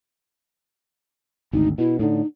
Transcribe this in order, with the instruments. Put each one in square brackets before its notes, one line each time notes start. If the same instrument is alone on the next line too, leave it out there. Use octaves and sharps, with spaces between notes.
[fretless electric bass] G#1 D2 [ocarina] D#4
[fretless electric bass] B2 [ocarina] E4
[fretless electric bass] A2 D3 [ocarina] D#4